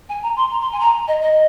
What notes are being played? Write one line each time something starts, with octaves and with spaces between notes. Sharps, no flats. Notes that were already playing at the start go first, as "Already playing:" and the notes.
G#5
A#5
C6
A#5
C6
G#5
A#5
D#5
D#5